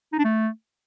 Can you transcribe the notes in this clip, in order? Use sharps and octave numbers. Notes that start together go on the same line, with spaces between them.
D#4
D4
A3